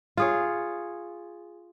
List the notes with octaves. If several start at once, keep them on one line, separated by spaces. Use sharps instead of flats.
F4 G#4 C#5